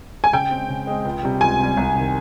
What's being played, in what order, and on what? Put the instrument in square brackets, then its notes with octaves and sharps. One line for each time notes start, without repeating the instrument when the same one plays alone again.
[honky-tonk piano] G#5
[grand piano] C#3 [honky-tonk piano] G5
[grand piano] G#3 C4
C#3
G#3 C4
C#2
C3 G3
[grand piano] C#2 [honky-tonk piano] G#5
[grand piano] C3 G3
C2
C3 D#3